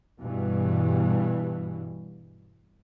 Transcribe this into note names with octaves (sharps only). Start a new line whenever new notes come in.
G2 B2 E3